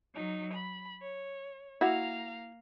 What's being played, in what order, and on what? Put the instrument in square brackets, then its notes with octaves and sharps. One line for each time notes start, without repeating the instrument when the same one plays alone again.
[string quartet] F#3 D#4
B5
C#5
[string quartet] A#3 F5 A#5 [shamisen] E4 F#4